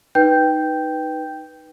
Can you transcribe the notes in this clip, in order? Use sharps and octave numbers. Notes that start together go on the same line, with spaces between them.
D#4 B4 G5 G6